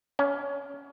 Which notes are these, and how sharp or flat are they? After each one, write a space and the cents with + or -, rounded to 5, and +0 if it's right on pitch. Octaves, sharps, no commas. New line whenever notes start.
C#4 +20